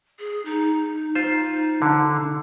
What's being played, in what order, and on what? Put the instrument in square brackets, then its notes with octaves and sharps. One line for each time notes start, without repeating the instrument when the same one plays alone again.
[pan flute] G#4
D#4
[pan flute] D#4 [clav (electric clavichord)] F4 C5
[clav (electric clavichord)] D3